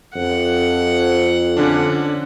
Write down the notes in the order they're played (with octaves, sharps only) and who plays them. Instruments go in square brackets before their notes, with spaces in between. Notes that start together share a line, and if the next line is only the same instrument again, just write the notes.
[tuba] F2 [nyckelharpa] F#5
[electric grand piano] D3 C#4 D4